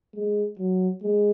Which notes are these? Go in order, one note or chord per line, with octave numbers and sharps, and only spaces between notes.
G#3
F#3
G#3